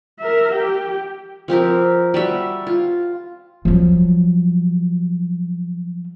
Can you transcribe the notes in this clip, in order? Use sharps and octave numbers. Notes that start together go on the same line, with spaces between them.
A#4 E5
G4 G5
F3 C4 G4 A#4
G3 F#4 E5
F4
F3 F#3